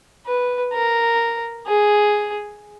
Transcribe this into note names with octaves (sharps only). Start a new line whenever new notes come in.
B4
A#4
G#4